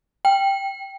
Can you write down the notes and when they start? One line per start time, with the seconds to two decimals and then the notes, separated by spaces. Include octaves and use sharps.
0.25 G5